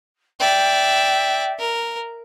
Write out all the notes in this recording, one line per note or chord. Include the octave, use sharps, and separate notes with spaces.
D5 E5 G5
A#4